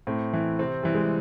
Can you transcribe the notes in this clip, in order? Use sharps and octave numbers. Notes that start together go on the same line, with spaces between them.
A2 C4
E3
C3 C4
E3 G3
G#3